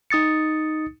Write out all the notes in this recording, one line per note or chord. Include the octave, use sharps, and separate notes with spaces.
D#4 D#6 A6 C#7